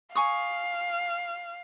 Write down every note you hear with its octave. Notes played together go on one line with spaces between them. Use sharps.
F5 G#5 C#6 D#6